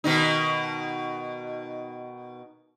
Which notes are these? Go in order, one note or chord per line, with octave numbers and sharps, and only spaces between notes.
B2 D#3 D#4